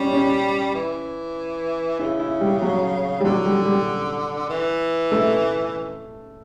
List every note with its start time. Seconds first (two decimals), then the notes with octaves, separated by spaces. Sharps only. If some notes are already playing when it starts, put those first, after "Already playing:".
Already playing: G3 C#4
0.12 C#4
0.74 E3
1.99 C#3 E4
2.20 E4
2.41 G3
2.62 F#3
3.21 G3
3.25 D3 F#3
3.46 G3
3.66 G3
4.50 E3
5.12 A3